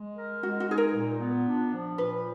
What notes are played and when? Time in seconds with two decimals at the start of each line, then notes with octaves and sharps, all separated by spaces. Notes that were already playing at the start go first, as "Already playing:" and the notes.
Already playing: G#3
0.17 A#4
0.43 G#3 F#4
0.60 F#4
0.69 D#4 G#4
0.78 A#4
0.95 A#2
1.20 B3
1.46 D4
1.72 F3
1.98 A#2 B4